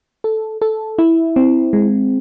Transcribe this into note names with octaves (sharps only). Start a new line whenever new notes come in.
A4
A4
E4
C4
G#3